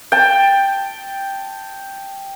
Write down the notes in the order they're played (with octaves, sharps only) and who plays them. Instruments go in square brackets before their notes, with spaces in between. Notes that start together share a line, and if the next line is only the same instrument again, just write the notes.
[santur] G5 A5